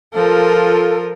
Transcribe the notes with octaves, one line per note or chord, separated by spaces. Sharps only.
F3 F4 A4 A#4